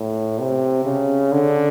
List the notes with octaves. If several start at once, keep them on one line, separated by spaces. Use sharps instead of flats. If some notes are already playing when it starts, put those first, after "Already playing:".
Already playing: A2
C3
C#3
D3